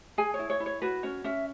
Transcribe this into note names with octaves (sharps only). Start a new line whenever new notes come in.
G#4 G#5
C#5
E4
C#5
E4
C#5
F#4 B4
C#4 C#5
C#4 E5